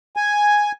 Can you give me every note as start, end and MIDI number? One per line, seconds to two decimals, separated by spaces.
0.17 0.72 80